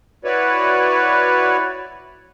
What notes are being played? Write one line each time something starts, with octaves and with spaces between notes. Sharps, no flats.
E4 F#4 B4 C#5 D5